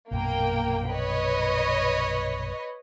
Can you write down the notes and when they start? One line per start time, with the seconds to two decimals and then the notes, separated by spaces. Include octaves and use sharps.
0.11 A#1 F#2 B2 A#3 G5
0.90 B4 C#5 D#5